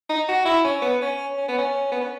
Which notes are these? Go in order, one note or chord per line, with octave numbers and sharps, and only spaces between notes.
D#4
F#4
E4
C#4
B3
C#4
C#4
B3
C#4
B3
C#4